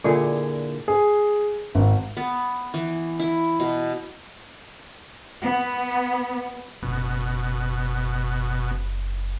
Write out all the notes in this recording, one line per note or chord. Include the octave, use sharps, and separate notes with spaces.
A#2 D3 E4 G#4
G#4
G#1
B3
E3
E4
B2
B3
F#1 B2